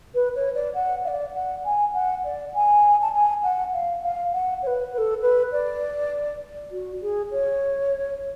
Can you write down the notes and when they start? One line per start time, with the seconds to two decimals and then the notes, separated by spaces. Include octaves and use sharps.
0.15 B4
0.35 C#5
0.55 D5
0.74 F#5
1.05 F5
1.08 D5
1.34 F#5
1.64 G#5
1.94 F#5
2.24 D5
2.54 G#5
3.02 A5
3.13 G#5
3.43 F#5
3.73 F5
4.02 F5
4.33 F#5
4.63 C#5
4.67 B4
4.93 B4
4.98 A4
5.22 B4
5.52 D5
6.71 F#4
7.01 G#4
7.31 C#5